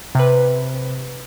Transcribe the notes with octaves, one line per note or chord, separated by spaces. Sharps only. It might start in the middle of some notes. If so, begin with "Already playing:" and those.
C3 B4